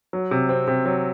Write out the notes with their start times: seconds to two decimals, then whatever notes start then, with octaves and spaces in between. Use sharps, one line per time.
0.13 F#3
0.31 C3
0.49 C4
0.67 C3
0.86 F#3